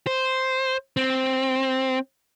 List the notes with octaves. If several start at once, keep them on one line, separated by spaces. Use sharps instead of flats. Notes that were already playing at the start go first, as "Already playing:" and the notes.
C5
C4